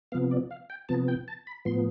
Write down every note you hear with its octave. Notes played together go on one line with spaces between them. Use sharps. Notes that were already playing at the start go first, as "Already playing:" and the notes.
C3 F3 B3 F5
D5
F5
G5
C3 F3 B3 A5
G5
A5
B5
A2 F3 B3 C6